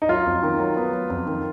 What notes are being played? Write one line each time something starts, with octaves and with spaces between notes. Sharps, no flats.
D#4
F#3 F4
F2
D#3
F#3
B3
F#3
F2
D#3